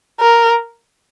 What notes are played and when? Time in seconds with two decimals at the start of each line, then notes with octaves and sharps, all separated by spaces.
0.20 A#4